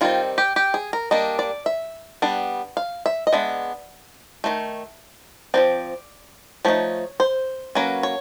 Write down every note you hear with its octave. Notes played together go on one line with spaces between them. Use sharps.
D#3 G3 C4 F4
G4
G4
G#4
A#4
G3 A#3 D4 D#5
D5
E5
G3 B3 D4
F5
E5
D#5
G#3 B3 D4 E5
D#3 F#3 A3
F3 A3 C4 D5
F3 A3 D#4 C#5
C5
F#3 A#3 C#4 B4
C#5